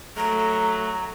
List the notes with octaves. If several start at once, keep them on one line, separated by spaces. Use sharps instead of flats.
F#3 A3 A#5